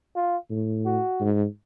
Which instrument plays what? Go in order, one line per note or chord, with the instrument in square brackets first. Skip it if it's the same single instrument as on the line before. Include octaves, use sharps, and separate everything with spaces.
[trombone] F4
[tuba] A2
[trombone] F#4
[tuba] G#2